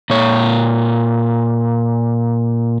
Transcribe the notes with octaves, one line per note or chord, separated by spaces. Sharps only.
A#2 C#5